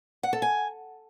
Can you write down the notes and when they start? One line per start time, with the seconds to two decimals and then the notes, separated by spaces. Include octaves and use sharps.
0.23 F#5
0.33 A4
0.42 G#5